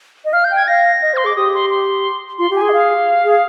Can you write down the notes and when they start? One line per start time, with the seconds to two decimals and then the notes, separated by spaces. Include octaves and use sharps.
0.25 D#5
0.33 F5 F6
0.44 G6
0.51 G5
0.56 G#6
0.68 F5 A#6
1.02 D#5
1.13 C5
1.17 C6
1.24 G#4 D6
1.36 G4 D#6
1.54 C6
1.70 C6
2.38 F4 C6
2.50 G4
2.55 G#5
2.62 G#4
2.69 D#5
2.73 F5
3.24 G#4